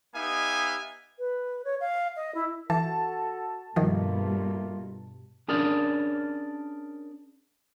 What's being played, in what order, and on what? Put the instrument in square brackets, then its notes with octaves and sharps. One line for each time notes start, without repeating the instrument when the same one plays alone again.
[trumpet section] B3 D#4 G4 E5 F5 G#5
[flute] B4
C#5
F5
D#5
E4
[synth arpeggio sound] E3 [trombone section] F#4 A4 [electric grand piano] A5
[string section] G2 B2 [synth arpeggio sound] D#3 F3 [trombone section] A3 A#3 F4
[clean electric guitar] C#4 D4 G#4 A#4 D5